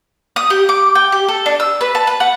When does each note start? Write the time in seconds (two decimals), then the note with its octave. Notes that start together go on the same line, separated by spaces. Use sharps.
0.36 D#6
0.50 G4
0.69 D6
0.95 G5
1.12 G4
1.28 A4
1.46 D4
1.60 E6
1.81 B4
1.95 A5
2.07 B4
2.20 F#5